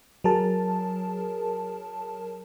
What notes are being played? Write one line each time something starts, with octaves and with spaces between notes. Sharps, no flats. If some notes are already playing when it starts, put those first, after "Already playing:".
F#3 G#4 A#4 A5